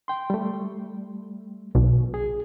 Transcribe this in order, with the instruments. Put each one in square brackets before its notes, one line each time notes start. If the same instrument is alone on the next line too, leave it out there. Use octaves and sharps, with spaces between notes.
[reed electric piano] G5 C6
G3 A3
[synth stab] B1
[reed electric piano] G#4